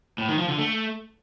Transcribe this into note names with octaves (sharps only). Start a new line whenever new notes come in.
A2
D#3
F3
D3
A3